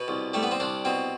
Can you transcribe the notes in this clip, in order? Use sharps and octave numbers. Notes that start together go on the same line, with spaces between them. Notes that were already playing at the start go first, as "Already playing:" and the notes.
Already playing: B2 B3
C2
G3 A3
B3
C4
C2 D4
B2 C4